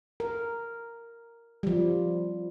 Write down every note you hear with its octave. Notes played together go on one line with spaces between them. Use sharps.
A#4
F3 G3